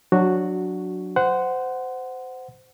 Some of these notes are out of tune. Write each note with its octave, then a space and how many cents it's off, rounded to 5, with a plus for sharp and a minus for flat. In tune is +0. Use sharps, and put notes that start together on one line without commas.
F#3 -15 D4 +0 F#4 +0
C5 -20 F#5 +5